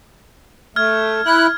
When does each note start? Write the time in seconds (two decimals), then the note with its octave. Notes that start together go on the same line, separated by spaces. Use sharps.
0.76 A3 F6 G#6
1.25 E4 F#6